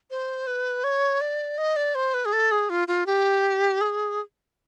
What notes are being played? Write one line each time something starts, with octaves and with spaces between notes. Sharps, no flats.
C5
B4
C#5
D5
D#5
D5
C5
B4
G#4
A4
G#4
F4
F4
G4
G#4